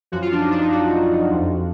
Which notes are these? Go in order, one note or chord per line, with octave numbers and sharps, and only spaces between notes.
F#2 F3 F#4
F4
D4
D#4
D4
D#4
F#4
F2 F3